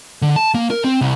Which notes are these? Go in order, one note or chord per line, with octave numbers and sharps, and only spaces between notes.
D3
A5
A#3
A#4
C4
C2